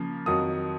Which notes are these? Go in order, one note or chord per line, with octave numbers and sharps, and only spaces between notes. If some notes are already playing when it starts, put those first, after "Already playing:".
Already playing: C#3 F3 A#3
F2 D#3 F#3 D#6